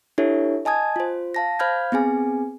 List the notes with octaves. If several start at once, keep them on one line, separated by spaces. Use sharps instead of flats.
D4 E4 G4 A4 C#5 E5
D#5 G#5 A5 D#6 G#6
F4 C5
F5 A5 A#6
C5 F5 B5 F6 G6 G#6
B3 C4 G#4 G#5